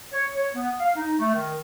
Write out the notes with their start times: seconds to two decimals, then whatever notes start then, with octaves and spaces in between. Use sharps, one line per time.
0.13 C#5
0.35 C#5
0.55 B3
0.80 F5
0.96 D#4
1.19 A3
1.34 D#3